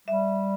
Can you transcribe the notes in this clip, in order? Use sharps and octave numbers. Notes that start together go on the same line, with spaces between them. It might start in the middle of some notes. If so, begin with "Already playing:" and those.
G3 E5